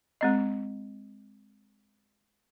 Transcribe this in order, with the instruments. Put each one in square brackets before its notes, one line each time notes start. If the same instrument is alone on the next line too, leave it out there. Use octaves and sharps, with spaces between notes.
[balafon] G#3 C4 D#5